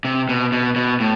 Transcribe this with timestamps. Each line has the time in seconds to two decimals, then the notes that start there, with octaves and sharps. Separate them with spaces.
0.05 C3
0.29 B2
0.52 B2
0.76 B2
1.00 A2